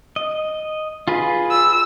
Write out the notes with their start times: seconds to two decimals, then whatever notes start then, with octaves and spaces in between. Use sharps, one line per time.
0.16 D#5
1.08 F4 G#4 B4
1.51 E6